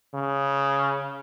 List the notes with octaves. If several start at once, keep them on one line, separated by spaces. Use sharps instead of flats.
C#3